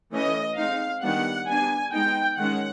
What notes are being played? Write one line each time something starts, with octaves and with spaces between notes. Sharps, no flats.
E3 A3 C#4 D#5
G#3 C4 D#4 F5
D#3 G3 B3 D4 F#5
G3 B3 D4 G#5
G#3 B3 D#4 G5
D#3 G#3 C#4 F#5